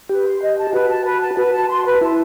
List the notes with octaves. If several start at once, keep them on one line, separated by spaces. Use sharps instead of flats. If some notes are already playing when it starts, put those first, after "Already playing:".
G4 B4
C6
D#5
A5
F#4 B4
A5
B4
A5
F#4 B4
A5
C6
B4
E4 A5